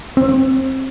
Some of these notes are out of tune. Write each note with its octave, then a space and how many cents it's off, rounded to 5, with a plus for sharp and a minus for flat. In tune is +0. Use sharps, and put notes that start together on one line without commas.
C4 +25